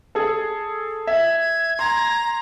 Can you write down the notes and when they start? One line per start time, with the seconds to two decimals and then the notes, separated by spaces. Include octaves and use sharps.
0.15 G#4 A4
1.07 E5 G#6
1.79 A#5 C6